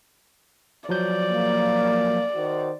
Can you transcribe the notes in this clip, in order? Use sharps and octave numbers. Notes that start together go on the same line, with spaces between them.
F3 F#3 D5 G6
A#3
D#3 F#4 C5